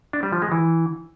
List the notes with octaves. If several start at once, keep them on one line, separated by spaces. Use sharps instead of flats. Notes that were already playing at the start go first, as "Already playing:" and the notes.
D4
G3
F3
G#3
E3